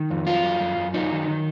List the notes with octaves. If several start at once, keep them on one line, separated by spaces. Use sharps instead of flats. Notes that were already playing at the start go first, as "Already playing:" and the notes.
Already playing: D#3
F2
F#3 F4
F#2
F#2
F#2
F#3 D#4
D#3
D#3